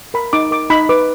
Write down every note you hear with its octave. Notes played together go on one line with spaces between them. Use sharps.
A#4 B5
D#4 D6
A#4 D6
D#4 B5
B4 D6